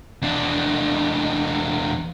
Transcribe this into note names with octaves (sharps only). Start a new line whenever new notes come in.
E2 D4